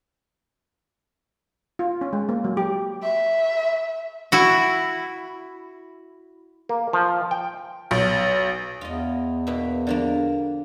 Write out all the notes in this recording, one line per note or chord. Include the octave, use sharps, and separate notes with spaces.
F4
C#4
G#3
A#3
F#3
G4
E5
E4 F#4
A#3
F3
G5
B1
E2 F4 D#5
B2 A#3 E4
D3 F3 A#3